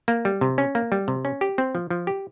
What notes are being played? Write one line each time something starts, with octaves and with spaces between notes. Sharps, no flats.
A#3
G3
C3
C#4
A#3
G3
C3
C#4
G4
C4
F3
F3
G4